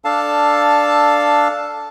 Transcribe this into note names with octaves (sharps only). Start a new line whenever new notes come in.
D4 A4 F5 A5